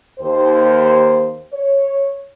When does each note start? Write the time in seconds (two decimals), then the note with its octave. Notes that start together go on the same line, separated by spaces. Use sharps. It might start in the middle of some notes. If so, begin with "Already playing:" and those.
0.19 D#2 C5
1.53 C#5